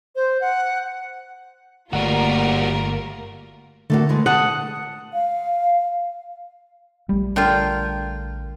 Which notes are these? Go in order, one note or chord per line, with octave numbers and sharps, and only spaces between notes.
C5
F#5
G1 G3 A3 A#3 F4 F#4 A#4
D3 A3 A#3 F#4
E3 G#3 A3
D4 F#5 A5 D#6
F5
A#1 G3 A3
D3 F4 A#4 G5